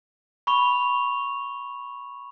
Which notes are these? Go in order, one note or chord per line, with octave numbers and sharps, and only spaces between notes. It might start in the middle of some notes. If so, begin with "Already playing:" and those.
B5 C#6 F7